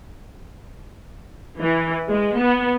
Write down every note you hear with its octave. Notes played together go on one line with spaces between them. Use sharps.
E3
G#3
B3